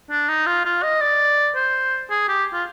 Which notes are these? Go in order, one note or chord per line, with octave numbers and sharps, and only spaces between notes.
D4
D#4
F4
F4
D#5
D5
C5
G#4
G4
F4